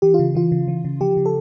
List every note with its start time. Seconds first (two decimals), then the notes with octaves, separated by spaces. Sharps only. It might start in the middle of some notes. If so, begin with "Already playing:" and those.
0.02 E3 G4
0.14 F4
0.19 C#3
0.35 E3 F4
0.52 C#3
0.68 E3
0.85 C#3
1.01 F3 G4
1.17 C#3
1.26 A4